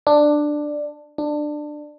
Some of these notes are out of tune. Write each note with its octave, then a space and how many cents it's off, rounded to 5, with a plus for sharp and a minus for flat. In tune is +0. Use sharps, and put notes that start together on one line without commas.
D4 +10
D4 +20